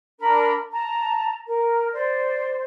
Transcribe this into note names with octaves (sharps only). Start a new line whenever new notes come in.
D4 A#4 B5
A5 A#5
A#4
C5 D5